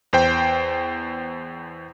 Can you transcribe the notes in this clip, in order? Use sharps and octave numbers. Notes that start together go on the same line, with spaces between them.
E2 C5 G5